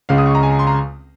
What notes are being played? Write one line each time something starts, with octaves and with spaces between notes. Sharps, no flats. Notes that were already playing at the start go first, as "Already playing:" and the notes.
C#2 C#3 G#3 F5
D#6
C#6
A#5
G#5
A#5
C6
A#5